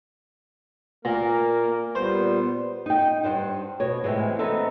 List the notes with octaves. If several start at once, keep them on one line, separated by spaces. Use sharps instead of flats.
A#2 A#3 A#4
A#2 G3 B3 C5
D#4 G5
G2 D#3 C5 F#5
B2 C#5
A2 C3 E3 G#3
B3 C4 D#4 A4 E5